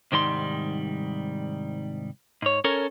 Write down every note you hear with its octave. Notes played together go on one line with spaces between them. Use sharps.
C2 G#2 D#3 G3 C6
G#2 C#5
C#4 A4 A#4 C#5